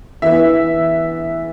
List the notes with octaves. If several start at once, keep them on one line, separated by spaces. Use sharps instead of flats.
E3 B3 E5